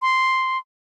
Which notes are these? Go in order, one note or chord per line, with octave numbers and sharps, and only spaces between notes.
C6